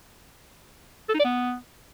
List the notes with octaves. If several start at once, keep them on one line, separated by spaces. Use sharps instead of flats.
A4
D#4
D5
B3